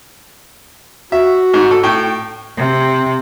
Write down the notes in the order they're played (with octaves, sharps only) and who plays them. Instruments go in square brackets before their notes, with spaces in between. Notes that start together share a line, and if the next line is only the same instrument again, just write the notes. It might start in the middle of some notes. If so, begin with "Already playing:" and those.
[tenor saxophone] F#4 [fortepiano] E5
[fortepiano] G#2
A4
A2 G5
[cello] C3